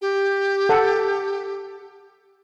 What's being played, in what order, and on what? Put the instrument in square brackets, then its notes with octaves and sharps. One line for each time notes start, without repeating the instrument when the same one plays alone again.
[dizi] G4
[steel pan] A4 F#5